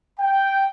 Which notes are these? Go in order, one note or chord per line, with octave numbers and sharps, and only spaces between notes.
G5